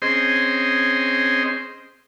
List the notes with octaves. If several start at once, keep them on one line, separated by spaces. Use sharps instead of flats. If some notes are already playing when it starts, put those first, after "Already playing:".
C4 C#4 G#4 C5 D#5 C6